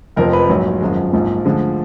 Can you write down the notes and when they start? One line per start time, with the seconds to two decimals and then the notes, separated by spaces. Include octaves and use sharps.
0.16 F1 F2 F3 A#4
0.33 B4
0.49 A#1 G#2 F#3
0.81 G#1 F#2 F3 G#3
1.13 A#1 G#2 F3
1.45 D2 D3 F3 G#3